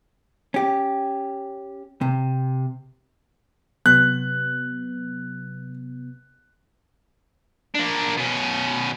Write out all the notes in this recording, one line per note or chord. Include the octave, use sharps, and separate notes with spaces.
C#4 G4
C3
C3 F#3 B3 F#6
A#3 D4
B2 C#4